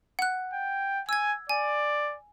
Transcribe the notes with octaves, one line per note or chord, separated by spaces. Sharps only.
F#5 F#6
G5
G#5 E6 G#6
D5 G#5